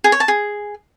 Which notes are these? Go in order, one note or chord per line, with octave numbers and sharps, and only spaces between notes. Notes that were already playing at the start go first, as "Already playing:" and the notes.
G#4
C#5
A5
G#4